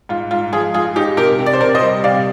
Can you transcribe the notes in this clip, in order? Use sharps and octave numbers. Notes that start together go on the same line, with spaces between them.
G#2 F4
G#2 F4
F3 F4 G#4
G#2 F4 G#4
G#2 D#4 G4
C3 G4 A#4
C3
D5
C5
C3 A#4 D5
C5 D#5
G3
C3 D5 F5